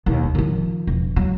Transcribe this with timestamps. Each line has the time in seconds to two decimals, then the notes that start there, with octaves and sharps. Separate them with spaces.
0.06 D#2 B2
0.35 D#3 F3
0.87 E1
1.16 F#3